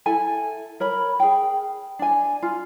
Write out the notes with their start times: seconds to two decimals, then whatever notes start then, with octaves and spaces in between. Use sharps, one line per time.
0.06 E4 A4 G#5
0.80 A#4 C#5 B5
1.20 G#4 G5
1.99 D4 G#5
2.42 F4